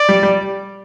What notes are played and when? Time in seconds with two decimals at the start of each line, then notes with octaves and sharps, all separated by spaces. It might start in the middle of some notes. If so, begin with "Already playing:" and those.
Already playing: D5
0.09 G3
0.23 G3